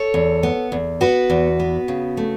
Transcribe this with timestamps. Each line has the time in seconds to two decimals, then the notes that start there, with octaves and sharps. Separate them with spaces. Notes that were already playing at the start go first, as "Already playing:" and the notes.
Already playing: A4 C#5
0.14 E2
0.43 B3
0.72 E2
1.01 B3 F#4 B4
1.30 E2
1.60 B3
1.88 C#3
2.17 A3